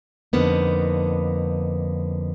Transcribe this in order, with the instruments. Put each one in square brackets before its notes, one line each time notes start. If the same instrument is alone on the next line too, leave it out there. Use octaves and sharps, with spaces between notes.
[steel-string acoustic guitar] F2 D3 A#3 B3 D#4